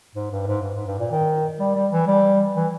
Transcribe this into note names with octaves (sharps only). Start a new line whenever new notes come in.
G#2
G2
G#2
G2
G#2
G2
A#2
D#3
G3
G3
E3
G3
E3